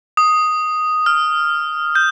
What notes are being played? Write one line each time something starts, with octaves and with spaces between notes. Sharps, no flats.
D#6
F6
G6